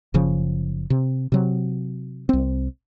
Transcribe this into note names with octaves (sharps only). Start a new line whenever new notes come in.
F#1 C#3 F3
C3
C3 F#3
C2 C4